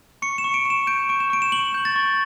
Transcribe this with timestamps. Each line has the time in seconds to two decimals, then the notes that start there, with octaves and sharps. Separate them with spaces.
0.22 C#6 C#7
0.38 E7
0.44 C#6
0.54 D7
0.65 C#6 E7
0.87 G6 D7
1.09 C#6 D7
1.20 E7
1.30 C#6 D7
1.42 E7
1.52 C#6 F#7
1.74 G6
1.85 A6
1.96 C#6